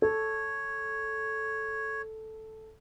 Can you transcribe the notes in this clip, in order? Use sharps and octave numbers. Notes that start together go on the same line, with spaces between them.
A4 C#5